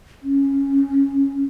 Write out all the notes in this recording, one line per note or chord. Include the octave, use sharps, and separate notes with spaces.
C#4